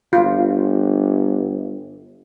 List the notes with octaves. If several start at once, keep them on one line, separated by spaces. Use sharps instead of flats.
G1 F4